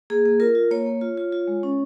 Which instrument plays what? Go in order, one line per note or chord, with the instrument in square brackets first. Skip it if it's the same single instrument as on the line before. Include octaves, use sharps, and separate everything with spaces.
[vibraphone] A#3 G#4
A#3
F4 A#4
F4
A#3 C#5
A#3
F4
F4
F4
G#3
C#4